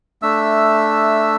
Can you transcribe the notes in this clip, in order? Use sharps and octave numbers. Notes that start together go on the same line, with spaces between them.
A3 D4 E5 E6